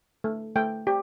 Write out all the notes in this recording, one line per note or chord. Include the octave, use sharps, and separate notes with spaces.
A3
A3 G5
G4